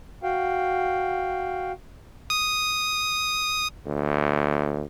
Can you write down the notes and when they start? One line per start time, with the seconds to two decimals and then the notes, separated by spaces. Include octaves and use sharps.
0.23 F#4 F5 G5
2.30 D#6
3.86 D2